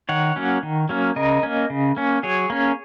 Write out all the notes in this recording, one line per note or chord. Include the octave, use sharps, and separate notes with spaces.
D#3 C#5 F#5
F#3 A#3 C#4
D#3
F#3 A#3 C#4
C#3 A#4 D#5
A#3 C#4
C#3
A#3 C#4
F#3 G#4 C#5
A#3 C#4